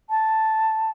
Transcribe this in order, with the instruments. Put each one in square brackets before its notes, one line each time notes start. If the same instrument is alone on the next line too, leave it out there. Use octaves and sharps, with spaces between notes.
[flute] A5